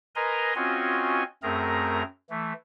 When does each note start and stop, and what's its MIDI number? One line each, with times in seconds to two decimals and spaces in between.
0.16 0.53 70
0.16 0.53 71
0.16 0.53 75
0.16 0.53 80
0.16 0.53 82
0.16 0.53 84
0.55 1.23 60
0.55 1.23 61
0.55 1.23 65
0.55 1.23 66
0.55 1.23 75
0.55 1.23 80
1.43 2.03 42
1.43 2.03 57
1.43 2.03 60
1.43 2.03 68
1.43 2.03 70
1.43 2.03 82
2.30 2.53 52
2.30 2.53 57